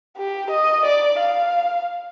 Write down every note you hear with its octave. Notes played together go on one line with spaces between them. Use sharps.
G4
D#5
D5
F5